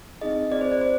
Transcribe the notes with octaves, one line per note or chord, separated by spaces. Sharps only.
C4 D#4 G#4 D#5
C4 F4 G#4 D5
C5
D5
C4 C5